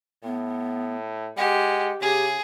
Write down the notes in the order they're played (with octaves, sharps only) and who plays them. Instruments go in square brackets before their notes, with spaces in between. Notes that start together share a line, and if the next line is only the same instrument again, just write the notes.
[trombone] A2 [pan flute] B3
[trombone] G#3 [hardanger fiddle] G4 [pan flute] F#5
[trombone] C#3 [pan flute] G4 [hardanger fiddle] G#4